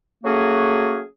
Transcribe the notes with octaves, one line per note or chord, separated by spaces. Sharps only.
F#3 A3 A#3 C#4 F#4 G#4